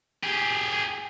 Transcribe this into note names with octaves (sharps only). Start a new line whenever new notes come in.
G4 G#4